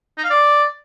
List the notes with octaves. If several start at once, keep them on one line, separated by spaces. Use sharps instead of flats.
D#4
F5
D5